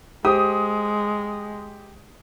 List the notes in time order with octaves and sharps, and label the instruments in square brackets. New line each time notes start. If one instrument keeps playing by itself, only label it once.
[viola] G#3 [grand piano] G4 C5 [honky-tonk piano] D#6